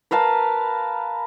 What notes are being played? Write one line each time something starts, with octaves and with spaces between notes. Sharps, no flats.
A#4 B4 F5 A5